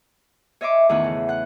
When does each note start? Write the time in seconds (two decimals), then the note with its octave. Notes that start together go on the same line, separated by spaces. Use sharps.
0.61 C#5 D#5 E5 C6 D6
0.89 E2 A2 D#3 C#4 C#5 F#5
1.04 C#3
1.29 F#5 F#6